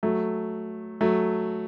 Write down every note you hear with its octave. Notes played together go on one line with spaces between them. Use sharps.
F#3 A3
F#3 A3